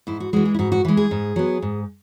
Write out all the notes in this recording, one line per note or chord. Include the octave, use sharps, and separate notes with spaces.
G#2 E4
F#4
E3 G#3 F#4
G#4
E4
G#2 F#4
F#4
E3 G#3 B4
G#4
G#2
F#3 B3
G#2